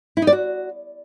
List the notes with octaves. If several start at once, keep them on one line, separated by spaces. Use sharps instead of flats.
E4
D#4
D5
F#4